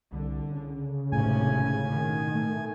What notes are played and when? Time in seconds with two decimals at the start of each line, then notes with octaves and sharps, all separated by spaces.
0.12 C2 D3
0.51 C#3
1.12 G#1 A2 C3 C#4 G#5
1.89 B2 D#3
2.35 A3